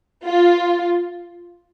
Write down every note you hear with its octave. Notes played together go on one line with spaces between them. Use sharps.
F4